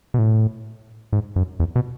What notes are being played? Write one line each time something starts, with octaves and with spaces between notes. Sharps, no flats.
B2
A2
G#2
F#2
E2
B2